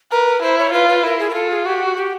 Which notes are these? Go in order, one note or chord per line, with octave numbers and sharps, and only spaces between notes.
A#4 B4
E4 C5
C#5
F4 B4
B4
E4 A#4
G#4
A#4
F4 A4
G#4
F#4 G4
G4